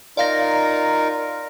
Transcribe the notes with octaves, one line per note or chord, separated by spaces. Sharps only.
D#4 F4 A#4 D5 F5 A#6